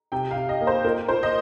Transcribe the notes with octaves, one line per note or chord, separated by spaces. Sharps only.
C3 G5
C3 F5
D#5
A#3
C5
A#2 A#4
A#2 C5
D#5